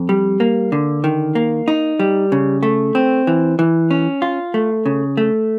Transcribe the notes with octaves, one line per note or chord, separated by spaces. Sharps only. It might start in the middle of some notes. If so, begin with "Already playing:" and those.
Already playing: F2
G3
A#3
D3
D#3
A#3
D#4
G3
C#3
A3
C4
E3
E3
C#4
F4
A3
C#3
A3